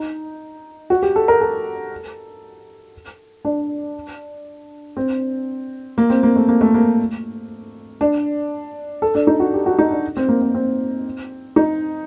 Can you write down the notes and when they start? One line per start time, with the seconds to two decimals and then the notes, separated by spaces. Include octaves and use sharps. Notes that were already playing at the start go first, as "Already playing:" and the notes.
Already playing: D#4
0.90 F#4
1.02 G4
1.16 A4
1.28 A#4
1.41 A4
3.45 D4
4.97 C4
5.98 A#3
6.10 C4
6.23 A#3
6.36 A3
6.49 A#3
6.61 A3
6.74 A#3
8.01 D4
9.02 A4
9.15 D4
9.27 D#4
9.40 F#4
9.54 G4
9.66 F#4
9.79 D#4
9.91 D4
10.17 C4
10.29 A#3
10.41 C4
10.54 C4
11.56 D#4